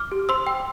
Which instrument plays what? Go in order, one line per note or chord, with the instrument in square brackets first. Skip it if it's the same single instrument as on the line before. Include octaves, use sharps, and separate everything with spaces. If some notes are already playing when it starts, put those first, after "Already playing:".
Already playing: [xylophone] D6 F6
G4
C5 C6 E6
G5